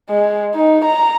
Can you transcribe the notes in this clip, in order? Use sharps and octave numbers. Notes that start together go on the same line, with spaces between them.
G#3
D#4
A#5